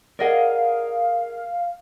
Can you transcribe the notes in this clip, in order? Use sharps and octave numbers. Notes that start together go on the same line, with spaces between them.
G#4 A#4 D5 D#5 F5 F#5